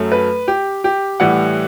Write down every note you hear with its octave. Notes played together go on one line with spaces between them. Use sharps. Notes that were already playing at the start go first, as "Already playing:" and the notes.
Already playing: F#2 F#3 A3
B4
G4
G4
A2 E3 G3 F#5